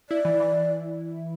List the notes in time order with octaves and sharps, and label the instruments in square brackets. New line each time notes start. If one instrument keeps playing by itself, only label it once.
[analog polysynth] E4 [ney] D5
[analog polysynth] E3
E3